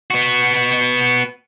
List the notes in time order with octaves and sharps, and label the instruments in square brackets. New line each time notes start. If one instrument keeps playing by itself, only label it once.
[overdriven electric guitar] B3 F#4